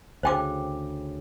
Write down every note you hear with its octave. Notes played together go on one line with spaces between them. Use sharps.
D2 C#3 C5 G5 D6